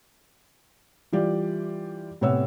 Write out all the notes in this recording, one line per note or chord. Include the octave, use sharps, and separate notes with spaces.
E3 G3 F4 G4 D5
A2 C3 B3 C#5 F#5 E6